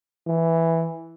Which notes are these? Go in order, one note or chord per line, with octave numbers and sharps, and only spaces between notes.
E3